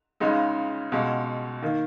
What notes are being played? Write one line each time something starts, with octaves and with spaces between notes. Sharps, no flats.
C#2 C#3 G#3 D#4
C#2 B2 G#3
D#3 A#3